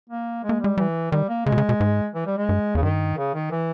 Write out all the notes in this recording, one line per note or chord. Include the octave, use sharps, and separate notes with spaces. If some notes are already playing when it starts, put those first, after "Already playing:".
A#3
G#3
A#3
G3 G#3
E3 G3
D#3 G3
A#3
C#3 G#3
B2
C#3
B2
G#2
E3
G3
G#3
G2
E2 C#3
G2 D#3
C#3
D#3
E3